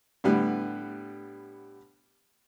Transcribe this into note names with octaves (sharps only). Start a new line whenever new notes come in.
A2 D3 G3 B3 B4